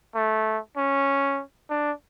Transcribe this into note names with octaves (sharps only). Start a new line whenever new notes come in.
A3
C#4
D4